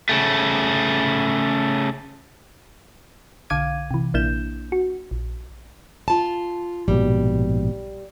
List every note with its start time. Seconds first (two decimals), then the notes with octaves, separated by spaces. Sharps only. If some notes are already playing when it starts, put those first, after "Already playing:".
0.09 C#3 A3
3.50 B1 D3 F5 D6 G#6 D#7
3.91 C3 E3
4.14 A#1 A#3 D4 E4 G6 E7
4.72 F#4
5.11 A#1
6.08 F4 A5
6.88 A#1 G#2 B2 G3